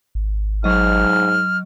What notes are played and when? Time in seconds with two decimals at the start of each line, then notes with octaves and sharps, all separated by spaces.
0.15 G#1
0.64 G#2 F#3 D#5 F6